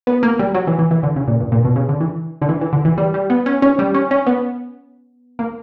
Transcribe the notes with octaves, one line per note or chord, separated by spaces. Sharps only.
B3
A#3
G3
F#3
E3
E3
E3
D3
C#3
A#2
G2
A#2
B2
C#3
D3
E3
D3
E3
E3
D3
E3
G3
G3
B3
C#4
C#4
G3
C#4
C#4
B3
A#3